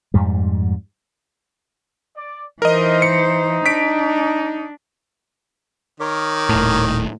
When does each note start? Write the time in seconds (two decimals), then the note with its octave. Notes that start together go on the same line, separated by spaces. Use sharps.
0.14 F2 G#2 G3
2.16 D5
2.62 E3 D#4 A#4 C5 D#5
3.02 C#7
3.66 D4 B6 D7
6.00 D#3 A#4 C#5 D6
6.49 D#1 A2